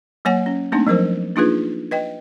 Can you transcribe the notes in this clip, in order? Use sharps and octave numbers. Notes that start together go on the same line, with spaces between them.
F#3 A#3 C#5 F#5 G#5
C#4
A3 A#3 C4 D4 D#4
F3 F#3 A#4 C5
A#3 D4 D#4 F4 G#4 B4
B4 D#5 G5